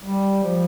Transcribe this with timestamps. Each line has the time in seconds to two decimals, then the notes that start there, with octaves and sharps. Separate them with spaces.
0.02 G3
0.44 F3